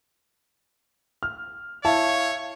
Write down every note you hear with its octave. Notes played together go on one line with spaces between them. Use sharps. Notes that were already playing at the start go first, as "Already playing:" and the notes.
F6
E4 C#5 F5 A5